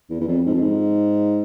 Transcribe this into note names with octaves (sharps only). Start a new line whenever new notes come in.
E2
E2
F2
G#2
F2
G#2